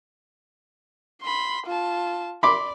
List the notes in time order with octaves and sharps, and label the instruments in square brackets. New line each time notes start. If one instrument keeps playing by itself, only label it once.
[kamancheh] B5 C6
F4 A5
[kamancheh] D5 [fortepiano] B5 C6 D6